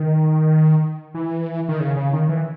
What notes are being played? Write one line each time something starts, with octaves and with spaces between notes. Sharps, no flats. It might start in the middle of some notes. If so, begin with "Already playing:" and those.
Already playing: D#3
E3
D#3
C#3
C#3
D#3
E3